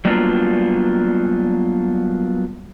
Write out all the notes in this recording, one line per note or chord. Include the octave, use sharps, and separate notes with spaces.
F#3 G3 A#3 B3 D4 F4